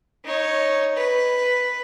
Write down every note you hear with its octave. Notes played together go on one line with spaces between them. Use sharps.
D#4 C#5
B4